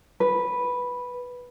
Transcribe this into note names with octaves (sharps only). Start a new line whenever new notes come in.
B4